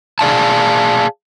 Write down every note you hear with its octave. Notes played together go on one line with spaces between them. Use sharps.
G#4 D5 F5 A5